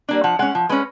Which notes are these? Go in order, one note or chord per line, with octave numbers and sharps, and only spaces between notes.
G3 A#3 D4
F3 F#5
G#3 C#4 F#5
F3
G#3 C#4 B4